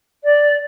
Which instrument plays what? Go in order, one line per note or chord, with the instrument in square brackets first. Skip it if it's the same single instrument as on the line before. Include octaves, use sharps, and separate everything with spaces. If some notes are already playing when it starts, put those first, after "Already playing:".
[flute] D5